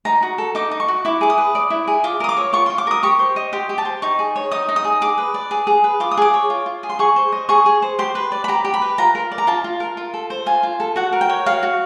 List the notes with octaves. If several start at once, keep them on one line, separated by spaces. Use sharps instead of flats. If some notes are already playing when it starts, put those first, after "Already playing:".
D#4 A#5
F#4
A4
D#4 D6
D#4
C#6
F#4
E4 D6
G#4 D6
D#6
B4
D5
E4
G#4
F4 D6
A#4 D#6
D6
C#5
F4 C#6
C6
F4
D6
A#4 D#6
G4 C#6
C5
D#5
G4 C6
G4
A5
C5
D#4 C#6
G#4
C#5
D#4 D#6
D#4
D#6
G#4
G#4 D6
B4
D5
G#4
G#4
B4
F4 D6
D#6
G#4 D6
C#5
F4
F4
G#4
C6
G#4 C#6
C5
D#5
G#4 C#6
G#4
C5
G4 C6
B4
D5
B5
G4 A#5
G4
B5
B4
F4 A#5
A#4
D5
A#5
F4 A5
F4
A#4
F4
A4
C5
F4 G#5
F4
A4
F#4 F#5
A#4
G5
C#5
F#4 F5
F#4